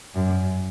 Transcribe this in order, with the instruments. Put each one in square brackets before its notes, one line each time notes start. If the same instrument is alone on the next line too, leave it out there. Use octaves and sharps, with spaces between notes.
[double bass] F#2